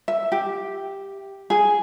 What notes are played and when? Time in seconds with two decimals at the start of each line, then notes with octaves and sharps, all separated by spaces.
0.08 E5
0.32 G4
1.50 G#4